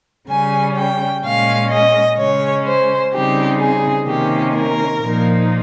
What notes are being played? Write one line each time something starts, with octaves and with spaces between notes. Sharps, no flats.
C#3 G3 C#4 G#5
G5
A#2 G#3 C#4 F5
D#5
C#3 G#3 C#4 C#5
C5
C#3 G3 C4 D#4 G4
G#4
C3 D#3 A#3 C#4 G4
A#4
A#2 F3 A#3 D#4